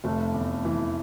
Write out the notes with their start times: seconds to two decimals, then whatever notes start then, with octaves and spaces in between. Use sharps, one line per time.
0.04 F1 A3
0.34 E2
0.65 E3